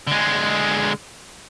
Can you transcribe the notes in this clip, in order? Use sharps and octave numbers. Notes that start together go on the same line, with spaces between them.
D3 G#3